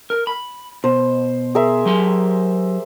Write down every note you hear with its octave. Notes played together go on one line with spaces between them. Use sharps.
A#4
B5
B2 C5
G#4 A#4 E5
F#3 G4 C6